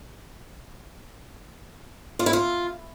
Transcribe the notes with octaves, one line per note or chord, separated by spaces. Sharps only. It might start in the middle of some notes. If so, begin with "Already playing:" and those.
F4
E4
F4